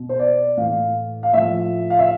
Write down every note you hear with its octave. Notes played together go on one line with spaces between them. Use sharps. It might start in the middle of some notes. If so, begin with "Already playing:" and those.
Already playing: B2
C5
D5
A2 E3 F5
F5
A2 F3 E5
F5
E5